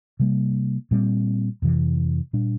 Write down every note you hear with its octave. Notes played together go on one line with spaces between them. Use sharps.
C3 G3 A#3
A#2 G3 C4
F2 C3 E3
A#2 G3 D4